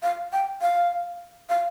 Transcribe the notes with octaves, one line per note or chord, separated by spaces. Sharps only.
F5
G5
F5
F5